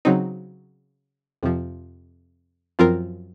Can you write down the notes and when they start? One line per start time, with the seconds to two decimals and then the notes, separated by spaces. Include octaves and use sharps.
0.05 C#3 F#3 C4 D#4
1.43 F2 C3 F3
2.79 F#2 F3 C4 F4 A#4